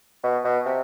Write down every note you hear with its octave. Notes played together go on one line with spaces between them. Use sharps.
B2
B2
C3